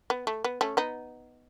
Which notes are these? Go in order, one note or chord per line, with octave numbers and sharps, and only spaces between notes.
B3
A3
B3
A3 C#4
B3 D#4